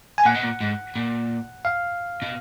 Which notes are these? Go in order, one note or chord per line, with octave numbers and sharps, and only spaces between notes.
G#5
A#2 F#5
B2
A#2
G#2
A#2
F5
B2